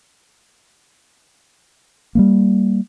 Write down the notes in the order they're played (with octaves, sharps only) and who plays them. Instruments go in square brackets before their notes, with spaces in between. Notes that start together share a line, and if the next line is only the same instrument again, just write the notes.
[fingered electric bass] G3 G#3 A#3